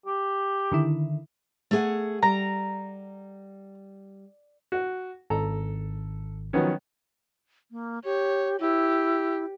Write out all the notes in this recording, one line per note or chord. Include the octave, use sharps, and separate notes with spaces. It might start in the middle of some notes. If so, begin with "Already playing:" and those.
G4
D3 D#3 E4
A3 G#4 F#5
G3 A#5
F#4
G#1 A4 A#5
D#3 F3 F#3 B3 C#4
A#3
G4 C#5
E4 G4